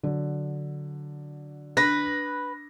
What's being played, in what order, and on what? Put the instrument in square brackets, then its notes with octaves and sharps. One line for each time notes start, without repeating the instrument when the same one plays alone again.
[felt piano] D3 F#3
[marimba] D4 [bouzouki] B4 [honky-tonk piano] A#6